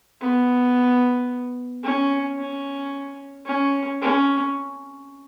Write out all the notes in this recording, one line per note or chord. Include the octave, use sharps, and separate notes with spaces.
B3
C#4
C#4
C#4
C#4